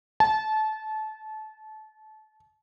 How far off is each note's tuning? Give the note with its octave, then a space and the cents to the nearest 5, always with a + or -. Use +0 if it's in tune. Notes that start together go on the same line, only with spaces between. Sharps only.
A5 -25